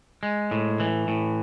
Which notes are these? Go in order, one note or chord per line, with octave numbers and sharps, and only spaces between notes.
G#3
A2
E3
A2